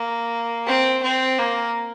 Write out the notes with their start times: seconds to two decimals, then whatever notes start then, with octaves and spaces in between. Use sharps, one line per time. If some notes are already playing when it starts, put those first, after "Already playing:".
Already playing: A#3
0.67 C4
1.02 C4
1.39 A#3